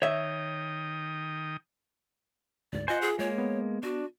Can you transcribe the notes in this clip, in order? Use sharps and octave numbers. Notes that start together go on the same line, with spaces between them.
D#3 C#5 E5 G5 D#6
D2 G#2 D5
F4 C5 D#5 F#5 G#5
G#4
G#3 A#3 C#5
B3
D4 F#4